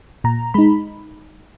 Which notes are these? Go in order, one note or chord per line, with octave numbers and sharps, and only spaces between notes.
A#2 A#5
G#3 D#4 B5